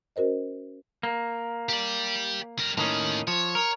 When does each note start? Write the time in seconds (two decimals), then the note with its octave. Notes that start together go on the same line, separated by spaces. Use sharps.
0.16 C#4 F#4 A#4 C5 D#5
1.03 A#3
1.69 G4 D5
2.59 G3 A#4
2.78 A2 D#3 A#3 C#4 D#4
3.27 F3 C#5
3.55 A#4